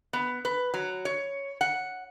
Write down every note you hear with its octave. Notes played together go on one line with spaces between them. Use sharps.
B3
B4
F#3
C#5
F#5